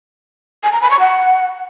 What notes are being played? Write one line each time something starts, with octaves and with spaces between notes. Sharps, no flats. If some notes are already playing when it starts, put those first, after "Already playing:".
G#5
A#5
B5
C#6
F#5